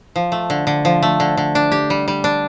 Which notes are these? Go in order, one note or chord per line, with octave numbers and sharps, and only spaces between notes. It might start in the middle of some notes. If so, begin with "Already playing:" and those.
F3
A3
D3
D3
F3
A3
D3
D3
D4
G4
G3
G3
D4